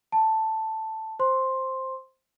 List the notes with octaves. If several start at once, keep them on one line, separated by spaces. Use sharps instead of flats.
A5
C5 C6